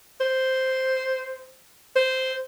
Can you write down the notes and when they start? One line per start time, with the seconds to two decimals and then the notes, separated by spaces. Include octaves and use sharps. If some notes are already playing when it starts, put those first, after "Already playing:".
0.21 C5
1.96 C5